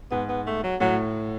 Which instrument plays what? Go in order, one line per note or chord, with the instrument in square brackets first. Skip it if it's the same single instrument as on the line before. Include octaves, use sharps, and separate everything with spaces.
[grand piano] G#2 [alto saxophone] B3
[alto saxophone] B3
A3
F#3
[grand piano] A2 [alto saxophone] F#3